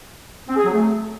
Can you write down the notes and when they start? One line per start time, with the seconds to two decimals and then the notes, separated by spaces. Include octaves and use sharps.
0.48 C4
0.56 G#4
0.64 F#3
0.73 A3